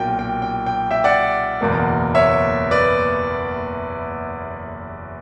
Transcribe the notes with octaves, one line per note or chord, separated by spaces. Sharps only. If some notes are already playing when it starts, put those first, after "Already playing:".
Already playing: B1 A#2 F#3 G5
G5
G5
G5
E5 G5
D5 F#5
F#1 E2 B2 A#3
C#5 E5
B4 D5